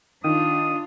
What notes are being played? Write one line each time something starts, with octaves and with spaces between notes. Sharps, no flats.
D#3 D4 F4 D#6